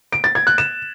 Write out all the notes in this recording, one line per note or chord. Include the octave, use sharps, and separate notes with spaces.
D7
A6
G#6
F#6
E7